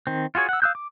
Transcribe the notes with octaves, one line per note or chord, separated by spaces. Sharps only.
D#3 C4
F4 F#4 G#4 C#5
F#5 E6
F5 D#6 E6 F#6 G6
D6